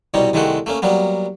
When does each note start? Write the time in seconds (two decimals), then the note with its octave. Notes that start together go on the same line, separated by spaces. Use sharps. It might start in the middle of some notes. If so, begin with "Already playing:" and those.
0.14 C2 B2 G3 D#4 C#5
0.33 C2 D#3 G#3 A3 G4 F#5
0.66 A3 A#3 C#4
0.82 F#3 G3 A#3 B3